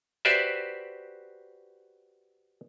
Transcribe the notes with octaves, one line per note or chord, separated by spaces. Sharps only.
F#4 G4 B4 C5 D5 E5